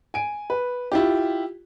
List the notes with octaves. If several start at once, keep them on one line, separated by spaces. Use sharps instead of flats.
G#5 D7
B4
E4 F4 G4